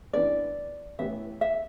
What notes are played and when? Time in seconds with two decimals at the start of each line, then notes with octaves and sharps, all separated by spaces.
0.13 E3 B3 D4 B4 D5
0.99 A2 E3 B3 G4 B4 E5
1.41 E5